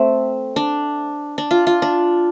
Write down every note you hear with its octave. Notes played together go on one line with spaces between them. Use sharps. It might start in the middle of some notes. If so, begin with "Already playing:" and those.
Already playing: A3 C4
D4
D4
F4
F4
D4